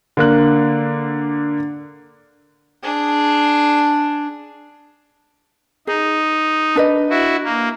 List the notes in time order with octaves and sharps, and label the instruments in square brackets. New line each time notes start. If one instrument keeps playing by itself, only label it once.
[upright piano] D3 A#3 F#6
[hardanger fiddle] D4 G#4
[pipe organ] D#4 [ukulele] G#4
[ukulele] D4 B4 D#5
[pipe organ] E4 F#4
A#3